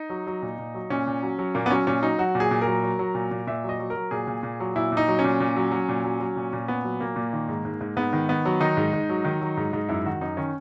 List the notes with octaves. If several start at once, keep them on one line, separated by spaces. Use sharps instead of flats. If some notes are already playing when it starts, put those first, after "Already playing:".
Already playing: D#4
F#3
F#3
A#2
A#2
F#3
A#2 C#4
A#2
F#3
F#3
A#2 A#3
B3
F#3 C#4
A#2 C#4
F#3 D#4
F#3 F#4
A#2
G#4
A#2
A#4
F#3
F#3
F#3
A#2
A#2
A#2 E5
F#3
D#5
F#3
A#4
F#3
A#2 G#4
A#2
A#2
F#3
A#2 E4
A#2
D#4
F#3
C#4
A#2
A#2
F#3
F#3
A#2
F#3
F#3
A#2
A#2
A#2 B3
F#3
A#2 A#3
A#2
D#3
G#2
G#2
G#2
G#2 B3
D#3
D#3 B3
F#3
D#3 D#4
G#2
G#2
F#3
D#3
F#3
G#2
G#2
F#2 E4
D#3 F#4
F#2 D#4
D#3 C#4